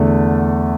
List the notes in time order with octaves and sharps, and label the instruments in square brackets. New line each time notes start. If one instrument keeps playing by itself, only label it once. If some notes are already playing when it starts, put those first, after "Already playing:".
Already playing: [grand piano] E2 D3 A3